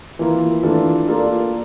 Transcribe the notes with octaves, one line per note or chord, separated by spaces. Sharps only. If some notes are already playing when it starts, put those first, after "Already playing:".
E3 A#3 F4
E3 A3 D4 F4 A4
A#3 F4 A4 D5